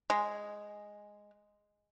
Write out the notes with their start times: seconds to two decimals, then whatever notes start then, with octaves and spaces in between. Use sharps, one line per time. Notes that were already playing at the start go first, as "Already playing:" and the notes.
0.10 G#3